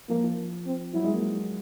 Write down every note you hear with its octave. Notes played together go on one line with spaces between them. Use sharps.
F3 A#3
F3
C4
F#3 E4
G#3
A#3